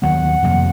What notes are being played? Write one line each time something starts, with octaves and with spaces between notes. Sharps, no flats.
D#2 D#3 F#3 B3 F#5
F2 C3 F3 A#3